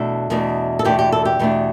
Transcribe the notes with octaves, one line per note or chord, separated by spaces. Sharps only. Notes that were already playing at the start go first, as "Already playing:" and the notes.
Already playing: E2 B2 A3 D4 A4
E2 B2 A3 D4
A4
E2 B2 A3 D4 G4
G4
A4
G4
E2 B2 A3 D4